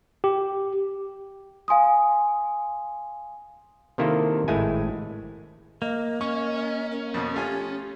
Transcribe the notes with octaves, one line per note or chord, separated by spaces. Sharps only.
G4
F5 G#5 C6 D#6
C3 D#3 A#3 E4 F4 A4
G#1 A2 G#3 A3 E4 G#5
A#3 D#5
C#4 C#6
A#4
F2 B2
A3 F4 G4 G#5